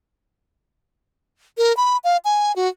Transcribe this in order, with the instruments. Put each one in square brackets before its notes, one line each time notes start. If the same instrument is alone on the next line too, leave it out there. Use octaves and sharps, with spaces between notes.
[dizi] A#4
B5
F5
G#5
F#4